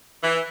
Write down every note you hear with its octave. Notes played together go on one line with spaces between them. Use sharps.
E3